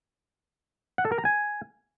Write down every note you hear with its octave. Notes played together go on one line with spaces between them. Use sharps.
F#5
A4
A#4
A#5
G#5